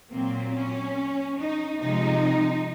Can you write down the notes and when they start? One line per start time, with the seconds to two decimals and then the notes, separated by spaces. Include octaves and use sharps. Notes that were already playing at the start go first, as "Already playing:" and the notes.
0.10 A#2 F#3 A#3 C4
0.53 C#4
1.38 D#4
1.80 C3 F3 G#3 D#4